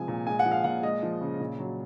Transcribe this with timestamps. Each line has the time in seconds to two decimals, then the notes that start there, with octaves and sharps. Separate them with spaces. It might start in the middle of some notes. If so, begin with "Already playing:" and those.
Already playing: C3 F3 G#3 G#5
0.08 A#2
0.27 G#3 G#5
0.39 F#5
0.45 F3
0.51 F5
0.64 A#2 F#5
0.83 G#3 D#5
1.03 F3
1.21 C#3
1.40 A#2
1.59 F#3